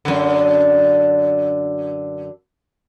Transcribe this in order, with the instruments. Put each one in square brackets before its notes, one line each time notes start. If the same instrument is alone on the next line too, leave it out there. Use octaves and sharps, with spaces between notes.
[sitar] F#2 D3